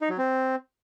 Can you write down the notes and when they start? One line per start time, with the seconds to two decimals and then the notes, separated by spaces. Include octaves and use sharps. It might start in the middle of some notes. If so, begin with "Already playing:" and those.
0.01 D#4
0.10 F#3
0.18 C4